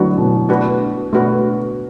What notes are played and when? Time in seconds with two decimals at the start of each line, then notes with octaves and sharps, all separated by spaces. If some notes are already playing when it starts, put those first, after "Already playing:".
Already playing: D3 E3 F#3 A3 D4 F#4 B4
0.18 B2
0.49 A3 D4 F#4 B4
1.12 B2 A3 D4 F#4 B4